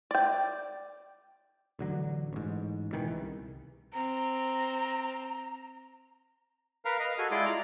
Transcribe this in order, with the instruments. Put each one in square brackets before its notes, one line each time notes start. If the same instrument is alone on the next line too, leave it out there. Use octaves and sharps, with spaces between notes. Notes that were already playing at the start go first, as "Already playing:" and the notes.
[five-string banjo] D5 G5
[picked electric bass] A1 D3 F#3
A1 G#2
G#2 B2 D#3 E3
C2
[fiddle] C4 [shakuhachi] A#5
[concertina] A#4 B4 F5 A#5
D#5 F5
F#4 G#4 A4 G#5
G#3 E4 F4 D5 C6 D6
A#5